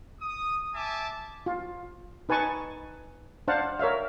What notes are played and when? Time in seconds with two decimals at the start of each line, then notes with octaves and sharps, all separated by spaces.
0.21 D#6
0.74 E5 G#5 A5 D6
1.46 F4
2.29 D#4 B4 G#5 A5 C#6
3.48 D4 C5 F5 F#5 A5
3.79 A#4 C#5 E5 F5